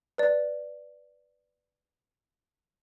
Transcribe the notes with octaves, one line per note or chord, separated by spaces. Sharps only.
B4 D5